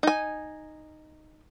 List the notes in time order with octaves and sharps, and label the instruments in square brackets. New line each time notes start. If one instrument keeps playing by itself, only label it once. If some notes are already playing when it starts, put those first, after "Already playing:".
[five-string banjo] D#4 G#5